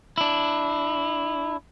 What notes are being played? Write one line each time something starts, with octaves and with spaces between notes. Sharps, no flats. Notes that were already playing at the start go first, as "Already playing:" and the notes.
D4 E4